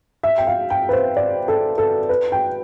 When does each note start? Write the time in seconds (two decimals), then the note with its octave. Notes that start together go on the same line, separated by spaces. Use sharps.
0.23 E5
0.38 G5
0.47 F5
0.70 G5
0.89 B4
0.93 C5
1.17 D5
1.48 A4
1.78 A4
2.09 B4
2.32 G5